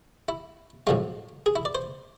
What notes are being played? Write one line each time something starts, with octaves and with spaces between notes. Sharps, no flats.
E4
B1 A2 F3 G#3 F4
G#4
E4
D5
C5